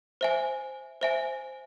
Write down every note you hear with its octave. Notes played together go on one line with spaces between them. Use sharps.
C5 E5 G#5
C5 E5 G#5